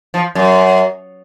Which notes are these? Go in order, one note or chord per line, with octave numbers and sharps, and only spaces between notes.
F3
F#2